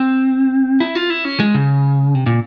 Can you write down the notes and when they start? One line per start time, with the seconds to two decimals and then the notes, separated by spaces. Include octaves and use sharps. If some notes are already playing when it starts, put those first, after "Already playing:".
Already playing: C4
0.80 E4
0.95 F4
1.10 E4
1.25 C#4
1.40 G#3
1.54 C#3
2.15 C3
2.26 A#2